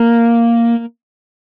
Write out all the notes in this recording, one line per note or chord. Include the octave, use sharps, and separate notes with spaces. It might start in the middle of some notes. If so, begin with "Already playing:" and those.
Already playing: A#3